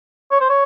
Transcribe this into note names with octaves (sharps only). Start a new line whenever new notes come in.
C#5
C5
C#5